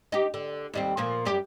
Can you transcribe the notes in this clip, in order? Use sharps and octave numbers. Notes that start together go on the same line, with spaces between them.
D#4 G4
D3
D#2 G3 C4
A#2 F3 A#3
F#2 G3 G4